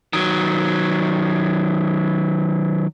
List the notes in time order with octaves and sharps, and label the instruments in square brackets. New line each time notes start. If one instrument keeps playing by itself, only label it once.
[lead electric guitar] D#3 F#3